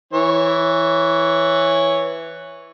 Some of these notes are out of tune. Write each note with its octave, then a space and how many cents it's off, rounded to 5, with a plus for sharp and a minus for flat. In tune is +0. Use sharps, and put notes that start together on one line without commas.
E3 +0 C#5 +0